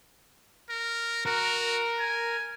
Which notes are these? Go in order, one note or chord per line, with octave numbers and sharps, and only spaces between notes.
A#4
F#4 A#4
G#5